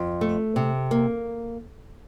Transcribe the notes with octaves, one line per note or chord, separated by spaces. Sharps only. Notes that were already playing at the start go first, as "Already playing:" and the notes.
Already playing: F2
A3
C3
A#3